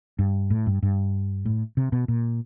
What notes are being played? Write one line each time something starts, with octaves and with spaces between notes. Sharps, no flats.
G2
A2
G2
G2
A2
C3
B2
A#2